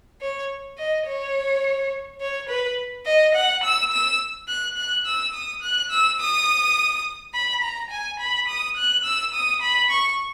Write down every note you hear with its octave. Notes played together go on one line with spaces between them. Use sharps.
C#5
D#5
C#5
C#5
B4
D#5
F#5
E6
E6
F#6
F#6
E6
D#6
F#6
E6
D#6
B5
A#5
G#5
B5
D#6
F#6
E6
D#6
B5
C#6